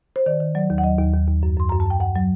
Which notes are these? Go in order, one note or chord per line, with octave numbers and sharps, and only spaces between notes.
C5
D#3 D5
D#3
F#3 D5
D#2
F#5
F#3 D#5
D#2
D#2
D#2
F#2
F#2 C6
F#2 A#5
A5
F#2 G5
F#2 F#5
F#3